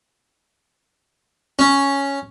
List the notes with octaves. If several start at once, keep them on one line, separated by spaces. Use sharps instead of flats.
C#4